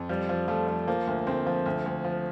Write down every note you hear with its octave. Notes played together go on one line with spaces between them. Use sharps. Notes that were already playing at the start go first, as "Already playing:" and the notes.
Already playing: F2
F3 G3
F3
F3 A3
F3
F3 A#3
D2
D2 C4
F3
D2
D2
F3